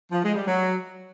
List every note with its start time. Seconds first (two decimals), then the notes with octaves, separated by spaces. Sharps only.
0.10 F3
0.22 G#3
0.34 G3
0.46 F#3